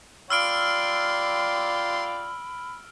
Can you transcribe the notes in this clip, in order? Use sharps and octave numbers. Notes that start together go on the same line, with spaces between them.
F4 D5 G5 B5 C6 E6 F6 D7